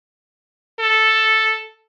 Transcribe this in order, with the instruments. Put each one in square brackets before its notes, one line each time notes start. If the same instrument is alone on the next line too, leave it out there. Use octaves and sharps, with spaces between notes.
[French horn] A4